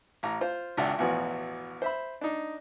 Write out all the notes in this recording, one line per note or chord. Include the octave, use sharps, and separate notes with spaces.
A1 A#5
F4 C5
G#1 C#2 D4 E5 F#5 G5
A1 E2 B2 E3 F3 F#4
C5 E5 B5
D4 D#4